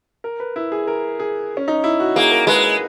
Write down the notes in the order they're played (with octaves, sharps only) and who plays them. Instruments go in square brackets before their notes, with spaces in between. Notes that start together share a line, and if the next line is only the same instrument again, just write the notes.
[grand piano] A#4
B4
E4
G#4
A#4
G#4
C#4
D#4
E4
F#4
[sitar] A#3 [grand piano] G#4
[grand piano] A#4
[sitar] G#3 [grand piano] B4
[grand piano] B4